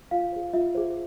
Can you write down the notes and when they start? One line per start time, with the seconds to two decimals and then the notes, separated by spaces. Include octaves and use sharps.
0.11 F4 F5
0.32 G#4 C5
0.53 F4 E5
0.75 G#4 C5